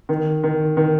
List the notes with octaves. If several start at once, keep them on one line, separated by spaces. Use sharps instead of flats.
D#3
D#3
D#3